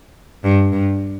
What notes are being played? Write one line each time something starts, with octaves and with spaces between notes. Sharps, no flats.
G2
G2